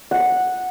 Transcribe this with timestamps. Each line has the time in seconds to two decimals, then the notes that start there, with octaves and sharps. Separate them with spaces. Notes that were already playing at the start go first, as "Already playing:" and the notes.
0.11 F#5